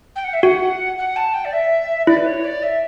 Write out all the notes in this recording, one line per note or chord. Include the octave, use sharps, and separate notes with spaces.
G5
F#5
E5
F#4 F#5 G5
F#5
A5
G5
D5
E5
E4 D5
B4
C#5
D5
E5